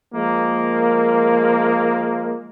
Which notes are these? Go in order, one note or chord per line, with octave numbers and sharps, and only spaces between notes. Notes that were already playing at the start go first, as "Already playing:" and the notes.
F3 G#3 A#3